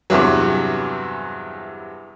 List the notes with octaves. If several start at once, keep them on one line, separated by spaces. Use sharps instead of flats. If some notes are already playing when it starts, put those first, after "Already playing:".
E2 G2 C3 E3 F#3